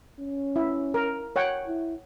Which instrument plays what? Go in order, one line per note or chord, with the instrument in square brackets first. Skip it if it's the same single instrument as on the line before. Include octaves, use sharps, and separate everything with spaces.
[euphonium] C#4
[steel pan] E4
A#4
C#5 F#5 G5
[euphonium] E4